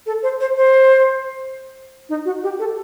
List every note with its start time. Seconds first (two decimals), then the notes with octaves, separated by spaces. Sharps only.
0.06 A4
0.23 C5
0.40 C5
0.57 C5
2.09 D#4
2.25 F#4
2.43 G4
2.59 A4